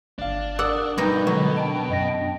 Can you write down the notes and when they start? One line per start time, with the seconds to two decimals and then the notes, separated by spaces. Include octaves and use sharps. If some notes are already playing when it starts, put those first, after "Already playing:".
0.19 G1 D4 F5
0.59 A#4 D5 F#5 D#6 E6
0.98 G2 B2 D#4 G5
1.27 B2 D3 F#3 G#3
1.57 D4 G5
1.90 F#2 D#5 A#6